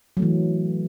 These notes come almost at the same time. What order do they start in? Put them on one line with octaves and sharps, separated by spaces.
F#3 A3 E3